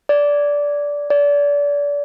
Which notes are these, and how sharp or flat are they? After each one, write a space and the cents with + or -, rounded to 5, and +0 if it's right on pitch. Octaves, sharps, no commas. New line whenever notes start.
D5 -15
D5 -30